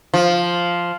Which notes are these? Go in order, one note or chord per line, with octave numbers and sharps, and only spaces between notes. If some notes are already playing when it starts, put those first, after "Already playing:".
F3